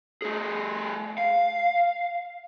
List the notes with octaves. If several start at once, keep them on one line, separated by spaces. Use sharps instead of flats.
A3 G#4
F5